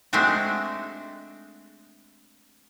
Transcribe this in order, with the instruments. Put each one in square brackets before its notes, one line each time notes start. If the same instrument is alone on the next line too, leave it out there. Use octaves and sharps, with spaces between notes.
[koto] G#3 A3 C4 D4 F#4